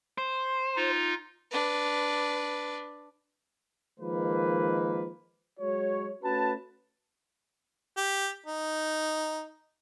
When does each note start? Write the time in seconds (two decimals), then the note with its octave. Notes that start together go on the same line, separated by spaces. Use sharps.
0.18 C5
0.76 D#4 F4
1.51 D4 B4
3.99 D#3 F3 G#3 A#3 B4
5.60 F#3 G#3 F#4 C#5
6.24 A3 C#4 F#4 B4 A5
7.97 G4
8.46 D#4